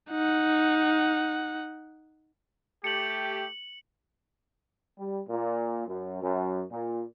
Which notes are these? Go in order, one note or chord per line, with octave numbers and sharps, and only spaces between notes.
D#4 F#5
A3 G4 C#7 F#7
G3
A#2
F#2
F#2
A#2